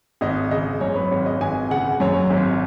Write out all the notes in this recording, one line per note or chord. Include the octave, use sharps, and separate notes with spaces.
G#1 D#5
C#3 D#5
F#2 C#5
B4
G#1 C#5
D#5
G#1 G#5
C#3 F#5
F#2 C#5
G#1